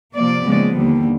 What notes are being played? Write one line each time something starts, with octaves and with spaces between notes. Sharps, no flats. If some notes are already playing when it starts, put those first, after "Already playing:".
C3 F3 A#3 D5
D#2 C#3 F3 G#3 B3
D#2 D3 G3